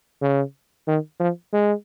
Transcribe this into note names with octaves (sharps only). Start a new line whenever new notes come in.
C#3
D#3
F3
G#3